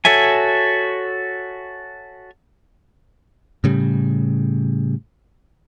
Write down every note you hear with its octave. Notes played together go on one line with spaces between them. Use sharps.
F#4 A4 C#5 E5 G#5
A2 C#3 G3